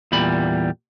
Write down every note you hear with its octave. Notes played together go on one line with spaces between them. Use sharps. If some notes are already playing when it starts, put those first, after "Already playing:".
E2 A#2 G3 B5